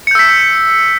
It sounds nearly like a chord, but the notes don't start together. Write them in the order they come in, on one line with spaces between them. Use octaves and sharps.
C#7 G6 E6 B6